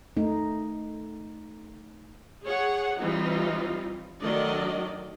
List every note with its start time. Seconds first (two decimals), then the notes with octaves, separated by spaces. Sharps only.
0.17 A3 D#4
2.44 G#4 C#5 F#5
3.01 E3 G3 C4 D#4 F4
4.21 D#3 F#3 A3 D4 D5 D#5